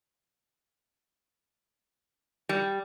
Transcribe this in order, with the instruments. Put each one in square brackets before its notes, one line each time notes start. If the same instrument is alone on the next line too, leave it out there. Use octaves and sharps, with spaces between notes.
[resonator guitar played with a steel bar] G3